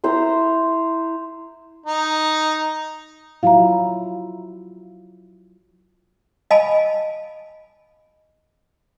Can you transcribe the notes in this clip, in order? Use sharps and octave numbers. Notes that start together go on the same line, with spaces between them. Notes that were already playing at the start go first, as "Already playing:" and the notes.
E4 C5 A#5 C6
D#4
F#3 E4 F4 F5 A#5
D#5 F5 G#5 A5 B5